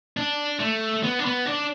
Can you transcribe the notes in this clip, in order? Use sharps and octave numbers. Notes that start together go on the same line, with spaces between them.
D4
A3
B3
D4
B3
D4